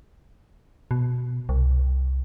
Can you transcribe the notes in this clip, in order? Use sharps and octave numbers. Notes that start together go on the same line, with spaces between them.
B2
C2